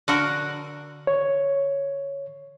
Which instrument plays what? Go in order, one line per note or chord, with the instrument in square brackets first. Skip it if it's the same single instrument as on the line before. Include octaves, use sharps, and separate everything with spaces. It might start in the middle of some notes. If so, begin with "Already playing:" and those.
[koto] D3 F#4 A#4
[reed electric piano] C#5